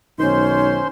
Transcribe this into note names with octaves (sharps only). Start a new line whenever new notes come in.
B1 D#3 C#4 C5 C6